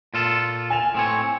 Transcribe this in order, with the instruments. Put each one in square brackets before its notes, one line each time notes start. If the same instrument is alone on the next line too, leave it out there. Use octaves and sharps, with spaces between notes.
[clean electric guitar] A#2 F4 A4
[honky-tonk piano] G#5 E7 F7
[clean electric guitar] A2 C4 C#5